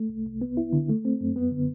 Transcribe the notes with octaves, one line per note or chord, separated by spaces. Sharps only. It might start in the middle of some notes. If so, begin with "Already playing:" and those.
Already playing: A3
C2
C2
B3
E4
D3
A3
C4
F#2
B3
D3